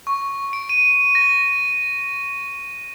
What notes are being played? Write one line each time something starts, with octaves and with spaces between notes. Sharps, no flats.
C#6
D7
D#7
A#6